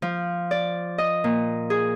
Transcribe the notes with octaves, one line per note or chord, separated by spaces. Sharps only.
F3
D5
D#5
A#2
G#4